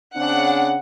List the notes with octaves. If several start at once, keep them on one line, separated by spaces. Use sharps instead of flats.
C#3 C4 D4 F#5